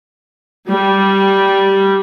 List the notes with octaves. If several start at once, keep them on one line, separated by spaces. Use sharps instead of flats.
G3